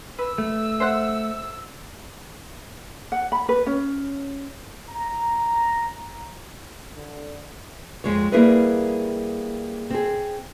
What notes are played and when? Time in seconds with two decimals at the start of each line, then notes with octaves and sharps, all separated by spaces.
0.18 B4 E6
0.38 A3
0.80 C5 E5 F#5
3.12 F#5
3.32 B5
3.49 B4
3.66 C#4
4.89 A#5
6.95 D3
8.04 F2 G#3 C#5
8.32 G3 A#3 E4 G#4 A#4 B4
9.90 C4 G#4